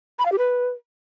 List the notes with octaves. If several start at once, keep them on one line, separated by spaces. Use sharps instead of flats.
B5
F5
G4
B4